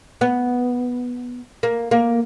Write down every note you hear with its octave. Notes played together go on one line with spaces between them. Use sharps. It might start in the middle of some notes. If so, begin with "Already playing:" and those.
B3
A#3
A#3